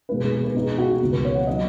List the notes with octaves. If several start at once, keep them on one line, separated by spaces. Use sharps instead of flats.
B2 G#3 D#4 B4
G#4
G#4
B4
B2 B3 D#4 G#4
F#4
C#2 B2 B3 D#4
B4
C#5
F#5
F#3 D#4 D#5